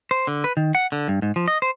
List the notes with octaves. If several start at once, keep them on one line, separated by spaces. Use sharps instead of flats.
C5
D3
B4
D#3
F#5
D3
G2
G#2
F3
D#5
C5